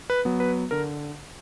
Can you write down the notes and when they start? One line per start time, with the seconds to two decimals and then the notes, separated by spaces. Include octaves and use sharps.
0.10 B4
0.25 F#3 B3
0.40 B4
0.71 D3 A#4